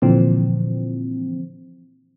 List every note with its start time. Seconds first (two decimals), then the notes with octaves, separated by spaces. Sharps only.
0.02 A#2 D3 E3 F3 C4